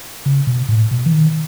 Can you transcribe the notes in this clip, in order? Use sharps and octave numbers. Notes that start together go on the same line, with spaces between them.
C#3
B2
A2
B2
E3
D#3